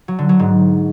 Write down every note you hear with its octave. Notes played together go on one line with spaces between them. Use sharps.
F#3
D3
F#3
G#2